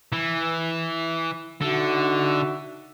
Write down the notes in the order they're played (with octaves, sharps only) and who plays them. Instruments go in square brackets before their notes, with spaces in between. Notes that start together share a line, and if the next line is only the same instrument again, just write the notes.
[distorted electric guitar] E3
[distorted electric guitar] D3 [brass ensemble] D#4 F#4 E5